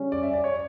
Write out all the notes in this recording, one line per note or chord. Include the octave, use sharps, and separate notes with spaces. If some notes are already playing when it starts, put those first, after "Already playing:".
Already playing: C#3 G3 C#4
D5
E5
D5
C#5